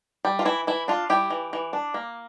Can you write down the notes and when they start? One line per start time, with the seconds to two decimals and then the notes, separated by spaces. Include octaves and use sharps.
0.25 G3
0.39 F4
0.45 E3 E4
0.67 E3 E4
0.88 D4 F4
1.10 G3 E4 G4
1.30 E3
1.53 E3
1.73 D4
1.94 A#3